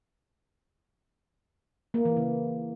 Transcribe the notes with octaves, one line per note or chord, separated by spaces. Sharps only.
A#3
E3
C#3